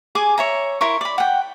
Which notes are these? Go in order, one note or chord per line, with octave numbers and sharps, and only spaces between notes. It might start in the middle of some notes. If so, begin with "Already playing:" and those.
G#4 G#5 D6
C#5 E5 A#5
E4 A#4 C6 C#6
D5 B5
F#5 G5